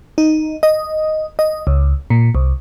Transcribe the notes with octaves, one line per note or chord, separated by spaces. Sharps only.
D#4
D#5
D#5
C#2
A#2
C2